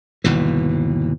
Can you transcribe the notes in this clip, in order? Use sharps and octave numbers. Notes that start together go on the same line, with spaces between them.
G1 D#2 B2 E3